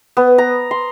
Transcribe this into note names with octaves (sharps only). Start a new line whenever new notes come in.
B3
A#5
C6